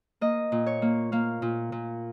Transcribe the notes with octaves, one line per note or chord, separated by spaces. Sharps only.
A#3 D#5
A#2
C#5
A#3
A#3 F5
A#2
A#2